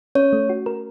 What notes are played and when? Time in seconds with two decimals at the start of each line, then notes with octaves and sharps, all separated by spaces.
0.15 C#4 C#5
0.33 A3
0.49 F#4
0.66 A#4